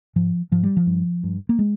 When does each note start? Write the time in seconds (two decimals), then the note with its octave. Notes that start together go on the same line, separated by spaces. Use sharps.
0.16 G#2 F3
0.52 G#2 F3
0.63 G3
0.77 F3
0.87 G2
1.24 G2
1.49 A#3
1.59 G#3